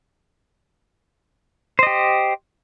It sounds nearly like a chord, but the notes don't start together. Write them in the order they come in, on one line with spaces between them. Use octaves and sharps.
C5 D#5 G4